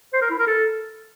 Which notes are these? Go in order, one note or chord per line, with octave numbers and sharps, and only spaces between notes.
C5
A#4
E4
A#4
A4